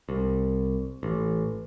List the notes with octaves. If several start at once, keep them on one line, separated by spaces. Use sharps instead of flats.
C2
A1